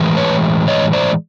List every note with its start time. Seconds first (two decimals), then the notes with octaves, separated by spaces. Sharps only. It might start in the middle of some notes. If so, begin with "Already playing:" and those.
Already playing: A2 E3 G#3
0.17 B4 C#5
0.68 C#5 D#5
0.93 C5 D5